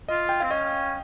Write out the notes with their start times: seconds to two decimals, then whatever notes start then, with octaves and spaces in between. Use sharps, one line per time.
0.08 F4 D#5
0.29 G5
0.40 C4 F5
0.51 C#4 D#5